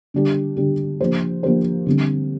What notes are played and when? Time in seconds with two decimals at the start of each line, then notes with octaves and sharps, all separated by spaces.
0.14 D3 G3 D4 G4
0.57 D3 G3 D4 G4
1.00 F3 A#3 D4 G4 C5
1.43 F3 A#3 D4 G4 C5
1.86 D3 G3 C4